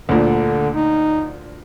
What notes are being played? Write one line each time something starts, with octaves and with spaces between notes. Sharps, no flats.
D2 A#2 D3
D#4